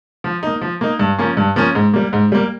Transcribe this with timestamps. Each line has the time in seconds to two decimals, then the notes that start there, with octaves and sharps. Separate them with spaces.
0.24 F3
0.43 A#3 D#4
0.62 F3
0.81 A#3 D#4
0.99 G2
1.18 F3 A#3 C#4
1.37 G2
1.56 F3 A#3 C#4
1.75 G#2
1.94 G3 A#3
2.13 G#2
2.32 G3 A#3